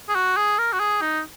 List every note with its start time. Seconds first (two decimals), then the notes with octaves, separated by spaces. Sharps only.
0.09 G#4
0.15 F#4
0.37 G#4
0.58 A#4
0.73 F#4
0.79 G#4
1.01 D#4